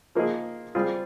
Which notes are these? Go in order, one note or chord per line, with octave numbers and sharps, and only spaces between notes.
F3 A#3 D#4 G#4
G3 C4 F4 G#4